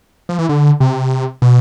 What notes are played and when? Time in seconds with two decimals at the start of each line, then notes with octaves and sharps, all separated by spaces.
0.29 F3
0.39 E3
0.49 D3
0.80 C3
1.42 B2